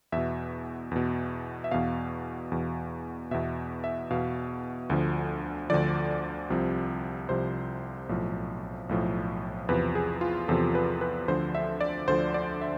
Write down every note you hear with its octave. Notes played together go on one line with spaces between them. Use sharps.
E2 B2 E5
E2 B2
E5
E2 B2 F5
E2 B2
E2 B2 E5
E5
E2 B2 F5
D2 D3 F3
D2 D3 F3 D5
C2 C3 F3
C2 C3 F3 C5
B1 A2 F3
B1 A2 F3
E2 C3 F3 B4
G#4
F4
E2 C3 F3 A4
B4
B4
D2 D3 F3 C5
E5
D5
D2 D3 F3 C5
D5
E5